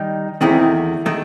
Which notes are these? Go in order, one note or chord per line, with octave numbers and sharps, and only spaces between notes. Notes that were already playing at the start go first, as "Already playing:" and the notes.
Already playing: D#3 G3 D#4
E2 D#3 A3 C4 E4
D#3 A3